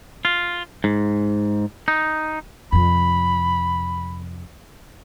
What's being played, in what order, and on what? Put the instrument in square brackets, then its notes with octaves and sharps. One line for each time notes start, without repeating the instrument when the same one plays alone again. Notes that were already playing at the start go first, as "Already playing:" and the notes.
[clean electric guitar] F4
G#2
D#4
[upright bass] F2 C3 [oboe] B5